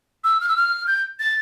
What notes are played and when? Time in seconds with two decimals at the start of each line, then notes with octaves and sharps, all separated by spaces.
0.24 E6
0.41 F6
0.49 E6
0.56 F6
0.87 G6
1.20 A6